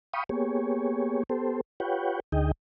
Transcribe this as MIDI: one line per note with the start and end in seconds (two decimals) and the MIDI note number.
0.13 0.24 77
0.13 0.24 79
0.13 0.24 83
0.13 0.24 85
0.13 0.24 87
0.29 1.23 58
0.29 1.23 59
0.29 1.23 67
0.29 1.23 68
0.29 1.23 73
1.29 1.61 59
1.29 1.61 67
1.29 1.61 69
1.29 1.61 72
1.80 2.20 65
1.80 2.20 67
1.80 2.20 71
1.80 2.20 73
1.80 2.20 78
1.80 2.20 79
2.32 2.52 38
2.32 2.52 50
2.32 2.52 63
2.32 2.52 68
2.32 2.52 75
2.32 2.52 79